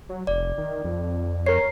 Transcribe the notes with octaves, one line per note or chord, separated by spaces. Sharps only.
F#3
F1 D5
D#3
F2
A#4 C#5 C7